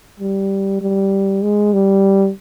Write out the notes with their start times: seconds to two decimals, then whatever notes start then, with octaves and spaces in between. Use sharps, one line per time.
0.20 G3
0.81 G3
1.42 G#3
1.73 G3